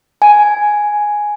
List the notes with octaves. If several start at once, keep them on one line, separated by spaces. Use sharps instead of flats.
G#5